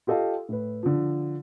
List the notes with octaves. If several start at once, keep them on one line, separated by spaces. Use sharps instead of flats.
F4 G4 A4 D#5 F5
A2 B4
D3 F3